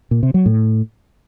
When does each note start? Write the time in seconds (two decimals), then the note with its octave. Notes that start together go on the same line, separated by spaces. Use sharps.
0.11 A#2
0.23 C3
0.34 F#3
0.46 A2